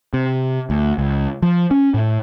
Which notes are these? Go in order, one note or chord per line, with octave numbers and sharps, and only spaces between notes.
C3
D2
C#2
F3
C#4
A2